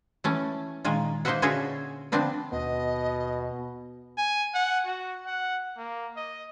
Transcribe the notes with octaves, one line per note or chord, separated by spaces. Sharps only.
E3 A3 C#4
A#2 D#3 G#3 F4
A#3 D#4 C5 D#5 E5 F#5
D3 C#4 F4 F#4 G#4 E5
D3 F3 B3 C4 D4 B4
D#2 B2 B3 D#5
G#5
F#5
F#4
F#5
A#3
D#5